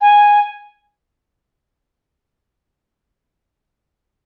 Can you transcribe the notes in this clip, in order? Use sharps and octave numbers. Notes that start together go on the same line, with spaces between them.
G#5